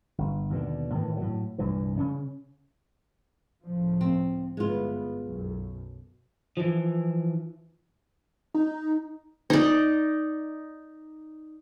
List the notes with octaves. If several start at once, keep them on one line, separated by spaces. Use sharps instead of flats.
G1
D#2 B2 D3
A2 D#3 E3
A2 F#3
C2 G2 A#2 E3
C#3 C#4
C#2 A2 F3
C4
G1 G#3 B3 F4
B1 F#2
E3 F3
D#4
D#4 D5